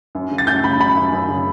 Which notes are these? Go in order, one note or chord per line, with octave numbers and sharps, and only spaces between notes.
F#2
C#3
A6
F#2 G6
C#3 B5
F#2 B5
F#2
F#2
C#3